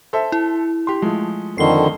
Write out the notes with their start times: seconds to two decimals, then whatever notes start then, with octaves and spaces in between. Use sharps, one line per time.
0.13 A4 C5 E5
0.32 E4
0.87 G4 C6
1.02 F3 G#3 A3
1.58 F2 D3 D#3 C7 G7